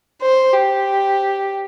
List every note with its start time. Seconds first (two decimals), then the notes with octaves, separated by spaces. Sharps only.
0.22 C5
0.53 G4